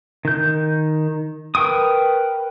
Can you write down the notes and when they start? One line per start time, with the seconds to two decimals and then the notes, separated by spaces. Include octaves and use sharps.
0.25 D#3 G6
1.55 A#4 B4 G5 C#6 D#6